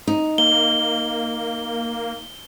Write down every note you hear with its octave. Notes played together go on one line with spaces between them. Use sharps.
D#4
A#3 G7